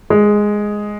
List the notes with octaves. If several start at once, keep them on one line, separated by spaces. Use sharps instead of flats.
G#3